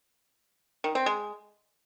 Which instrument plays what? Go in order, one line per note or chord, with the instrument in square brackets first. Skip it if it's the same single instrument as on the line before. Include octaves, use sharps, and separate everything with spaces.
[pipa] D#3
C4
G#3